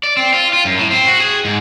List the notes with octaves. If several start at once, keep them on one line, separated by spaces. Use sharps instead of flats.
D5
C4
F4
F4
F#2
A2
C4
F#4
G#4
G#2